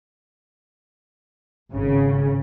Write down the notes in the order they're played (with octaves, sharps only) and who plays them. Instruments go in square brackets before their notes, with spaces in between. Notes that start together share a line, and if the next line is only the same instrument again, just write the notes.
[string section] G#1 C#3